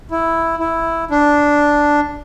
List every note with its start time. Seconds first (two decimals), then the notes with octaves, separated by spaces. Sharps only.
0.11 E4
0.60 E4
1.11 D4